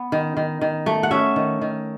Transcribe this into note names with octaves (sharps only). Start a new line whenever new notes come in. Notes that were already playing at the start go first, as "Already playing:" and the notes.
Already playing: B3
D#3
D#3
D#3
A3
F#5
C#4 E5
D#3
D#3